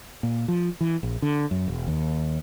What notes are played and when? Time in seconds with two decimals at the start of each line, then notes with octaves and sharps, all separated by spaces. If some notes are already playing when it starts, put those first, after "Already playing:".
0.23 A#2
0.48 F3
0.81 E3
1.03 A#1
1.22 D3
1.51 F#2
1.68 E1
1.88 D#2